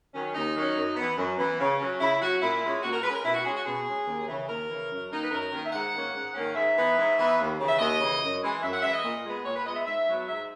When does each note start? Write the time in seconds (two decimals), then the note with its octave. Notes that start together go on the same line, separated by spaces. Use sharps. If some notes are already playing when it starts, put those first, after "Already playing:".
0.13 D#3 F#3 C#4
0.34 D#2 D#4
0.56 D#3 F#3 C#4
0.76 F#2
0.96 E3 B3
1.17 F#2
1.38 E3 B3
1.59 C#3
1.80 F#3 C#4
1.99 C#3 E4
2.21 F#3 C#4 F#4
2.41 A#2 E4
2.62 G#3 C#4
2.83 A#2 F#4
2.93 A#4
3.03 G#3 B4
3.07 C#4
3.14 A#4
3.24 B2 E4
3.34 F#4
3.44 G#3 C#4 G#4
3.55 F#4
3.65 B2 G#4
3.86 G#3 C#4
4.06 D#2
4.28 C#3 E3
4.48 D#2 A#4
4.69 C#3 E3
4.90 F#2
5.10 D#3 A#3 D#4
5.23 B4
5.31 F#2 A#4
5.52 D#3 A#3 D#4
5.65 E5
5.73 G#2 F#5
5.93 D#3 A#3 C#4
6.14 G#2
6.34 D#3 A#3 C#4
6.49 F#5
6.55 G#2 E5
6.76 E3 B3 D#4
6.97 G#2
7.18 E3 B3 D#4
7.39 D#2
7.59 C#3 E3
7.69 E5
7.79 D#2 D#5
8.00 C#3 E3
8.21 F#2
8.41 E3 G#3
8.62 F#2 E5
8.73 F#5
8.83 E3 G#3 E5
8.93 D#5
9.03 A#2
9.24 G#3 B3
9.45 A#2 C#5
9.56 B4
9.66 G#3 B3 D#5
9.76 E5
9.86 G#2 E5
10.07 F#3 B3
10.28 G#2 E5